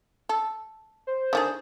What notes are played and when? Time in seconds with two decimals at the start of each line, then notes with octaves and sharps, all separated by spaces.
0.29 A4
1.07 C5
1.33 D3 D#3 G#4